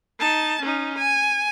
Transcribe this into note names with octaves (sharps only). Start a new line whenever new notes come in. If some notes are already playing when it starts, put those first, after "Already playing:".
D#4 A5
C#4 D#4
G#5